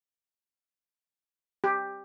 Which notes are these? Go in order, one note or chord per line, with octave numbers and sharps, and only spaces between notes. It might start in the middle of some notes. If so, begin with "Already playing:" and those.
G4